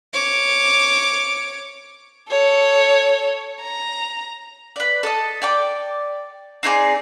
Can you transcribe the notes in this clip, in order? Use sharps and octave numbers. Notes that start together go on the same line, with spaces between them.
C#5 D6
A4 C#5
A#5
B4 D5
A4 D#5
D5 G5 D6
C4 D#4 G#4 D5